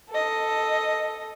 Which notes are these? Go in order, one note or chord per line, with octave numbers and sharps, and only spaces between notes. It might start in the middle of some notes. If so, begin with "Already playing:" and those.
A4 D#5